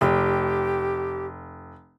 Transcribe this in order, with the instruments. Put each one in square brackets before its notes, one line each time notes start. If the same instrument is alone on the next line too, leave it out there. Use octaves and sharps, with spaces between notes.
[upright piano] F1 [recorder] G4